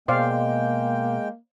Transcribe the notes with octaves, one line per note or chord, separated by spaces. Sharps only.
B2 G#3 A#3 C5 D5 F5 G5